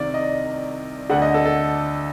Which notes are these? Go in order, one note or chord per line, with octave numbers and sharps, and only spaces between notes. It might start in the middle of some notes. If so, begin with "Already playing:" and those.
Already playing: C2 C3 D#3 D5
D#5
D2 D3 F#5
D#5
A4
A4